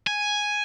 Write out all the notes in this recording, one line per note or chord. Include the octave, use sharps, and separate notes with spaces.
G#5